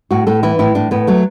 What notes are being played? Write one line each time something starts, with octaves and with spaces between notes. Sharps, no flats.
A2 F#4
A2 A4
E3 E4
A2 E4
A2 D4
A2 B3
F#3 A3